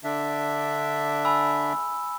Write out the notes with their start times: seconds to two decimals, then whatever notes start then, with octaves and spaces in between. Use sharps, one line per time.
0.04 D3 D4 E5
1.25 G#5 B5 E6